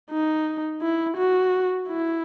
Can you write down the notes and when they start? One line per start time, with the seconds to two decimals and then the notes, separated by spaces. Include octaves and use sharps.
0.11 D#4
0.82 E4
1.17 F#4
1.89 E4